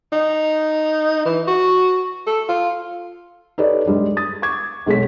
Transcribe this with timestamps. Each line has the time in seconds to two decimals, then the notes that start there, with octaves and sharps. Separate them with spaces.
0.13 D#4
1.26 E3
1.48 F#4
2.27 A4
2.49 F4
3.58 D#4 G4 A4 B4 C#5 D5
3.86 G2 G3 G#3
4.17 D#6 A6
4.42 C#6 D6 G#6
4.86 B1 G#3 A3 G#4 C#5 B6